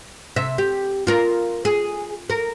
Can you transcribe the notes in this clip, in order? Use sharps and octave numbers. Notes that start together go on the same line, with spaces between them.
C3 E5
G4
F4 A#4
G#4
A#4